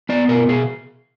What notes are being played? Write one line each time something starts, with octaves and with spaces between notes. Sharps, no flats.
B3 D5
B2 A#4
B2 G#4